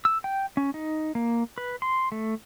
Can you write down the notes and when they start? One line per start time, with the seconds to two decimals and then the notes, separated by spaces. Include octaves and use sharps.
0.05 E6
0.24 G5
0.57 C#4
0.74 D#4
1.15 A#3
1.58 B4
1.82 C6
2.12 A3